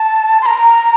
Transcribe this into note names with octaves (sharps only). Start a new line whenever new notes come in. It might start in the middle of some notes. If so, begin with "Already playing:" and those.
Already playing: A5
C6
A#5